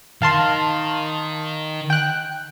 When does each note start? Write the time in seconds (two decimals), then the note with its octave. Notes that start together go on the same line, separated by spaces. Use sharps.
0.22 D#3 F5 A5 C6
1.90 G5 F#6